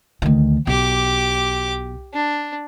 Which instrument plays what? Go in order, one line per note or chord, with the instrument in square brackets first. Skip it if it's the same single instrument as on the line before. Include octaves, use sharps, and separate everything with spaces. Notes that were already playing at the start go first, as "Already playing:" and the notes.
[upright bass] D2 D#3
[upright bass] B1 [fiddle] G4 D6
[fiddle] D4